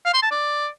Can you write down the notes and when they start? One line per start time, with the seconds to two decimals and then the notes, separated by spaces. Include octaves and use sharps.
0.05 F5
0.14 C6
0.23 A5
0.31 D5